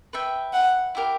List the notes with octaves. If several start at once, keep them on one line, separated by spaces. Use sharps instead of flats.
B4 E5 G5
F#5
E4 G4 A#4